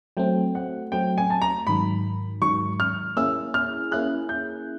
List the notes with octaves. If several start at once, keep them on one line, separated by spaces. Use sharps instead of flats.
F#3 A3 C4 G5
F#5
F#3 A3 C4 G5
G#5
A5
A#5
G#2 D#3 F#3 B5
G#2 D#3 F#3 C#6
F6
A#3 C#4 E4 G#4 E6
F6
A#3 C#4 E4 G#4 F#6
G6